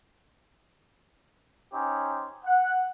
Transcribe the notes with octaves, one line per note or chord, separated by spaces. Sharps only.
C#4 D#4 G4 C5
F#5